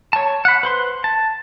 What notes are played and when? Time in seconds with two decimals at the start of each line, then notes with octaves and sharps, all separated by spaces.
0.13 C#5 A5
0.45 F#5 B5
0.63 B4 C5 C6
1.04 A5